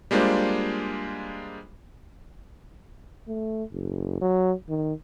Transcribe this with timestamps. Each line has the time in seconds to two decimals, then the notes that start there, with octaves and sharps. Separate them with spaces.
0.11 G3 G#3 A#3 D4 F4 C5
3.28 A3
3.72 F#1
4.21 F#3
4.69 D#3